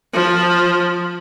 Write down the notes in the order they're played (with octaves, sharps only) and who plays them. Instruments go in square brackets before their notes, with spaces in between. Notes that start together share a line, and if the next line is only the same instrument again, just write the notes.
[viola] F3